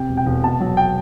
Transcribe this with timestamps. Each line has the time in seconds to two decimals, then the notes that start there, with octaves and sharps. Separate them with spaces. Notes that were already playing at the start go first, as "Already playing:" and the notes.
Already playing: C3 G5
0.09 E1
0.17 G5
0.26 E1
0.43 B2 A5
0.61 F#3
0.77 G5